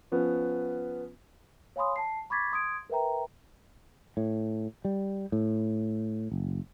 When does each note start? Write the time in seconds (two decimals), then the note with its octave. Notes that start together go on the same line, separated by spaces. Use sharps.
0.12 F3 B3 C#4
1.76 C#5 F5 G#5 B5 C6 D#6
1.96 A5 C7
2.30 B5 C#6 D6 G#6 A6 B6
2.52 C6 D#6 G#6 D7
2.90 A#4 B4 E5 G5 A#5
4.17 A2
4.85 G3
5.32 A2
6.32 F#1